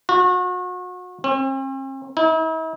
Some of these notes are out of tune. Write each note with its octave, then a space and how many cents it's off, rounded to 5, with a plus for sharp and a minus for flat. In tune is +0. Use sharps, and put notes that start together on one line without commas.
F#4 -35
C4 +45
E4 -45